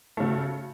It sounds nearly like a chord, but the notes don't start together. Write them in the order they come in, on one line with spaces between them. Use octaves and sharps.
A3 C#3 F#4